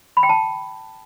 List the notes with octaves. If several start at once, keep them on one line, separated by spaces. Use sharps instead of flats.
B5
G5
A5